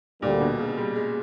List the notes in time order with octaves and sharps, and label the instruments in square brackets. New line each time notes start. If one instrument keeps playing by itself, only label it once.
[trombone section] D2 D3 G3 A#3 D4 [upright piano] A#2
[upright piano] B2
C#3
G3
G#3